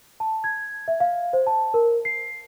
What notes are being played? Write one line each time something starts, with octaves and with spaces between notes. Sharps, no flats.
A5
G#6
E5
F5
C5
A5
A#4
C7